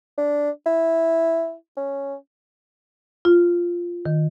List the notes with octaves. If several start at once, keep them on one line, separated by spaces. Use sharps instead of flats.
D4
E4
C#4
F4
D#3